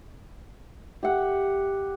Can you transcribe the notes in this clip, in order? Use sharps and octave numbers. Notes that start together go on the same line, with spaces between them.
G4 E5 F#5